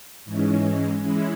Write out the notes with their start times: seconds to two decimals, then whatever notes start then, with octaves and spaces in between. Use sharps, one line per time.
0.25 G#2 E3 G#3 C#4
1.01 E3 G#3 C#4 E4